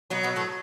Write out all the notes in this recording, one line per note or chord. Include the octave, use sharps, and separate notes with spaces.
B2 F#3 B3
B2 B3
A2 A3